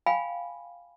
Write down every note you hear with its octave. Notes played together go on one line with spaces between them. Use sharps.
F5 G5 G#5 B5